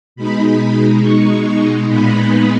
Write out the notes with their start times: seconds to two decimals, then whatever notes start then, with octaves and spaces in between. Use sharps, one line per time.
0.16 B2 G#3 D#4 B5
1.01 C#6
1.87 A#2 G#3 B3 D#4 B5